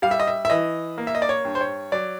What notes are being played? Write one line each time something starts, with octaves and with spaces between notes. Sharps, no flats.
G3 F5
E5
D#5
E5
E5
E3 D#5
A#3
E5
D#5
D5
C#5
G2
C5
C#5
F#3 D5